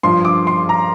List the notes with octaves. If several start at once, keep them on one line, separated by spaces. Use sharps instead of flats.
G2 F3 C6
D6
C6
A#5